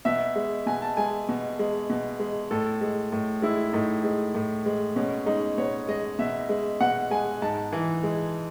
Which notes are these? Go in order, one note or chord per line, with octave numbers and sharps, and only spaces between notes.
B2 E5
G#3
B2 G#5
A5
G#3 G#5
B2
G#3
B2
G#3
A2 A4
G#3
A2
G#3 E4
A2 D#4
G#3
A2
G#3
B2 C#4
G#3 D#4
B2 C#5
G#3 D#5
B2 E5
G#3
B2 F#5
G#3 G#5
G#2 A5
E3
G#3